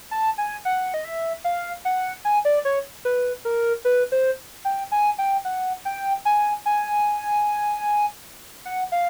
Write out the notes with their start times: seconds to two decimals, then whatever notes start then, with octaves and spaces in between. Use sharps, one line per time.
0.11 A5
0.38 G#5
0.65 F#5
0.94 D#5
1.05 E5
1.44 F5
1.85 F#5
2.25 G#5
2.45 D5
2.65 C#5
3.05 B4
3.45 A#4
3.85 B4
4.12 C5
4.65 G5
4.92 G#5
5.18 G5
5.45 F#5
5.85 G5
6.25 G#5
6.66 G#5
8.65 F#5
8.92 F5